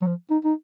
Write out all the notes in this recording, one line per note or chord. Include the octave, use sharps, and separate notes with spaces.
F#3
F3
D#4
D#4